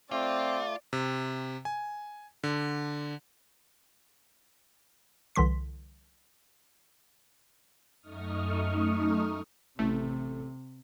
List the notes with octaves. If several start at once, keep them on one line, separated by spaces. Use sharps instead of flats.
A3 C4 F4 D5 D6
C3
G#5
D3
C2 D3 E3 C6 B6
F#2 A3 D#4 C#6 D#6 F6
A1 C3 A3